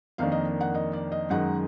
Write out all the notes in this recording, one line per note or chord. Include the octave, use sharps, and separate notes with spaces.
F2 D#3 A#3 D4 F5
D#5
F#5
D#5
D5
D#5
F#2 D#3 G#3 D#4 F#5